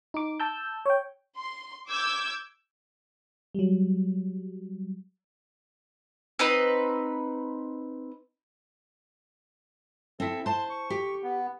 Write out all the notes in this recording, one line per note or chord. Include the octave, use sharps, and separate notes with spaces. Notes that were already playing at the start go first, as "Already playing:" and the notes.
D#4 D6
A5 E6 G6
C#5 G5
C6
D6 E6 G6 G#6
F#3 G3
C4 D#4 B4
C4 E4 A4
C5 A5 C6
C#6
G4
B3